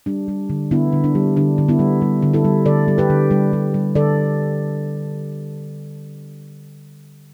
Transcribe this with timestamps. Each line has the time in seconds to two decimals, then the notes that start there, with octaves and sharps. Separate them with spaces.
0.06 G3 D4
0.28 G3
0.50 D3
0.71 D3 B3 E4
0.93 D3
1.04 D4
1.15 G3
1.37 D3 D4
1.58 D3
1.68 B3 E4
1.79 G3
2.02 G3
2.22 D3
2.33 E4 A4
2.45 G3
2.66 D3 A4 D5
2.88 G3
2.98 G4 B4
3.10 D3
3.31 G3
3.53 G3
3.74 G3
3.95 D3 A4 D5